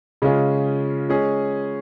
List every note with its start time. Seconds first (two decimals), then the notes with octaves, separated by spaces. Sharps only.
0.22 C#3 G#3 C#4 F4 G#4
1.09 G#3 C#4 G#4